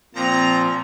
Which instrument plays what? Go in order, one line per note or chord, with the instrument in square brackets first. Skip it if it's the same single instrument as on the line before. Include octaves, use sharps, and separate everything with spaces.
[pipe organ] A#2 F3 [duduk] C4 [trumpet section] A#5